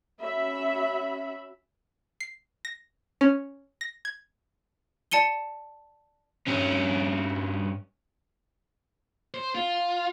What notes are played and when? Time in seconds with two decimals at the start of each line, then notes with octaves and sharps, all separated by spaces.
0.22 C#4 F#4 E5 B5
2.20 C7
2.65 A#6
3.21 C#4
3.81 A#6
4.05 G#6
5.11 D5 A5 C#7 D#7 G7
6.47 G2 C#4
9.34 C5
9.55 F4